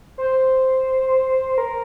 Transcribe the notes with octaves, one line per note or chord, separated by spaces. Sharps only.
C5
A#4